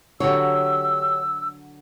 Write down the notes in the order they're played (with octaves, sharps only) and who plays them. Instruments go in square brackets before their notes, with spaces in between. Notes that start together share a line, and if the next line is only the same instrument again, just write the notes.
[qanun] D3 F#3 [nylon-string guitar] G4 C#5 [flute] E6